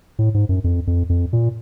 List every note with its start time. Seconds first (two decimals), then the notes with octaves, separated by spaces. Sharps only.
0.19 A2
0.34 G#2
0.49 F#2
0.64 F2
0.87 F2
1.09 F2
1.33 A#2